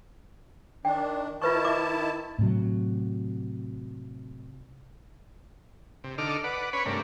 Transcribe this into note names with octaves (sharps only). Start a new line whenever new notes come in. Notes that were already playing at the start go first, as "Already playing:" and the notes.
D#3 D4 G5
D#3 E4 F4 B4 A5 C#6
E5 D6
A2 C3 F#3
C3
D3 D#4 A4 D6 F6
B4 D5 F#5
C#4 B4 C#5 B5
G2 C3 A3 D4 A#4